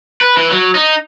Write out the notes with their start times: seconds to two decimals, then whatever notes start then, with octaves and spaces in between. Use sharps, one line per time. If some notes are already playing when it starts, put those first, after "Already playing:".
0.21 B4
0.37 E3
0.50 F#3
0.75 D#4